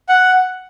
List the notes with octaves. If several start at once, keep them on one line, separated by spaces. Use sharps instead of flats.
F#5